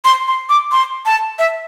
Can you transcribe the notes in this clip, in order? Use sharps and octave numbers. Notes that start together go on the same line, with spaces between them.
C6
C6
D6
C6
A5
E5